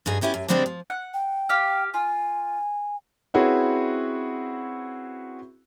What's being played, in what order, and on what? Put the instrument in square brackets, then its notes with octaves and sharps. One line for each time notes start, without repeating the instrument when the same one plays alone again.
[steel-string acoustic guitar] G2 D#4 G#4
B3 C#4 E4 G4 A#4
F#2
D3 G3 G#3 C4 D4
F3
[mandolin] F#5
[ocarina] G5
[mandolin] G4 F5
[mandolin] F4 [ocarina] G#5
[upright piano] C4 C#4 E4 F#4 G#4 B4